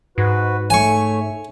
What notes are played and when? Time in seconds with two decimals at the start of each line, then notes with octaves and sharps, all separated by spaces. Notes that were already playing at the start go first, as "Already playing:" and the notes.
0.18 G#2 F#4 B4
0.70 A3 C#5 G#5 C#6